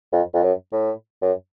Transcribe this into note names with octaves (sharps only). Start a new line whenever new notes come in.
F2
F2
F#2
A2
F#2